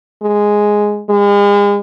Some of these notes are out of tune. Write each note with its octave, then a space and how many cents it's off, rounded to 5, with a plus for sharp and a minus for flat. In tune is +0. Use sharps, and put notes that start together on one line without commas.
G#3 +0
G#3 -40